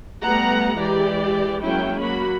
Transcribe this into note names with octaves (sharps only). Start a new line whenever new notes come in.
G3 A3 B3 F#5 A#5
E3 G#3 G4 D5
F#3 G#3 A#3 C#4 E4 G5
F#3 A#3 F#4 B5